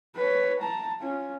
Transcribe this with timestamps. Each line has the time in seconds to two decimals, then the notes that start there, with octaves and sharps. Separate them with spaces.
0.16 B4 C#5
0.61 A5 A#5
1.00 C#4 F4